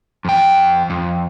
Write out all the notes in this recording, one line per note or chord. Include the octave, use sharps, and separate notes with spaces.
F2 G5
F2